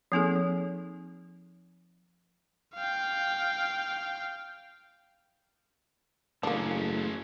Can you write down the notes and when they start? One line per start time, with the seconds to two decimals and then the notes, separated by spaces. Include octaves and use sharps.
0.12 F3 A#3 C4 D#4 G#4 A4
0.36 F3
2.75 F5 G5
6.43 F#1 E3 A3 A#3 C#4 D4 G#4 A4